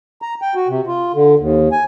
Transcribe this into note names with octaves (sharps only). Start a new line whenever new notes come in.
A#5
G5
F#4
C3
F4
D3
D#2
G#5